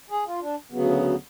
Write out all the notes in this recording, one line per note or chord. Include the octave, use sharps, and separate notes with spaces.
G#4
F4
D4
D2 C#3 F#3 B3